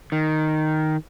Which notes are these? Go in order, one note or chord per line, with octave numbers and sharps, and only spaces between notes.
D#3